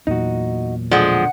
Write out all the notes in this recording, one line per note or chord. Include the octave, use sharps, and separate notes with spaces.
E2 A#2 F#3 D#4 F#4
B2 D3 F3 G#3 D5 F#5